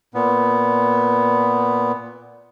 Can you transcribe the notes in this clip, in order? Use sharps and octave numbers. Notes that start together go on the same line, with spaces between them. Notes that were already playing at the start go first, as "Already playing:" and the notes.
A#2 B3